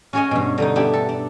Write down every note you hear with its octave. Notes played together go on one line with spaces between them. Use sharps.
C#4 F#4 G#4 C#5 D#5 G#5
G2 B2
D3 G3 D#4
B3 D4 E4 G4
A4
D4